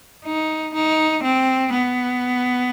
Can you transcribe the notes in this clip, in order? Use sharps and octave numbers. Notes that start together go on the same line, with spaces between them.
D#4
D#4
C4
B3